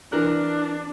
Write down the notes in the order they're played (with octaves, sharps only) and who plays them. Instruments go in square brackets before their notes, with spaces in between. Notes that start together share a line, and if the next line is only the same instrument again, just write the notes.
[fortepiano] E3 A#4 F#6 [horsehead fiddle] D4